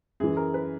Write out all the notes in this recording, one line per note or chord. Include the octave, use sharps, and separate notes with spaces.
F#2 E3 G#4
A#4
B4